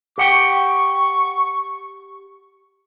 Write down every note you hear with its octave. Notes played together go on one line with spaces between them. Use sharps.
G4 F#5 G5 C#6